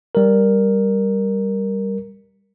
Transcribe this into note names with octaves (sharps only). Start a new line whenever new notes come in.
G3 A#4